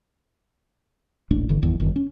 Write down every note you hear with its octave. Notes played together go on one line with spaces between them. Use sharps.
D#1 A1 A3 D4
G1 D3 E3
G1 E2 D#3
G1 F2 D#3
C#4